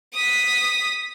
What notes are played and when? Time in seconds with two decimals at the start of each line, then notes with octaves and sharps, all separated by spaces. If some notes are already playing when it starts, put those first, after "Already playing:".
0.13 D#6 B6